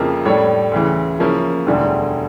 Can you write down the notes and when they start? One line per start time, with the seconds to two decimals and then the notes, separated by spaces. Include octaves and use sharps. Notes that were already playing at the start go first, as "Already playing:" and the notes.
Already playing: F2 C#3 F3 A#3 E4
0.25 A2 G3 D4 A4 C#5
0.72 D2 C#3 E3
1.19 C#3 F3 A#3 C#4 E4
1.66 E1 D2 D3 G3